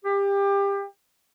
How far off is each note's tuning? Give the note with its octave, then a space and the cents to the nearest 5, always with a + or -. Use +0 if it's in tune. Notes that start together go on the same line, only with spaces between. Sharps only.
G4 +25